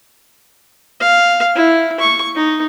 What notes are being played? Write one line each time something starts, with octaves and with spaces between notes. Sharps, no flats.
F5
E4
C#6
D#4